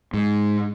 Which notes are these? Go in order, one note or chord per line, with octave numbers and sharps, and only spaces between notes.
G#2